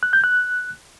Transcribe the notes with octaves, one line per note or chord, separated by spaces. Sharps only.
F#6
G6
F#6